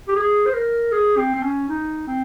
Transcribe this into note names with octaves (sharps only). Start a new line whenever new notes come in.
G4
G#4
C5
A#4
G#4
C4
C4
C#4
D#4
C4